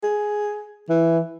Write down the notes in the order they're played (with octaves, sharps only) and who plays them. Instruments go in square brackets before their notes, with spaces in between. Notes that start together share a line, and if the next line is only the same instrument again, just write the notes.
[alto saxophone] G#4
E3